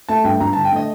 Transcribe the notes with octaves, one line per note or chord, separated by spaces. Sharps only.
A3 A5
G2 G5
G2 A#5
D3 A5
G5
A3 D#5